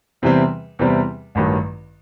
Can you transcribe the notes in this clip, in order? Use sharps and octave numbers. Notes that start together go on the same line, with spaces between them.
E2 C3 E3 G3 C4
E2 C3 E3 G3 C4
A1 G2 D#3 F#3